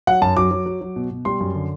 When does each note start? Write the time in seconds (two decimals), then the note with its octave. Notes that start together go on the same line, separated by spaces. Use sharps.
0.07 F#3 F#5
0.22 F#2 A5
0.37 F#3 D6
0.51 F#3
0.66 F#3
0.81 F#3
0.96 B2
1.10 B2
1.25 G3 C6
1.41 F#2
1.55 D3